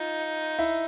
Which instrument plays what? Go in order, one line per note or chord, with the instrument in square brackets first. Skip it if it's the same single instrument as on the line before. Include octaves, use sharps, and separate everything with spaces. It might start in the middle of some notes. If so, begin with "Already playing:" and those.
Already playing: [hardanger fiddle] D#4 [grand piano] F4
[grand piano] E4